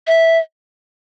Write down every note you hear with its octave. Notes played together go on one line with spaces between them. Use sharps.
E5